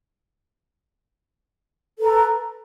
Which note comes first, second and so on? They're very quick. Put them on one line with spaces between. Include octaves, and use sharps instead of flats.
A4 B4 A#5